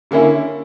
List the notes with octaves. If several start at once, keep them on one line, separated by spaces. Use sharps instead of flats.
D3 A#3 C#4 E4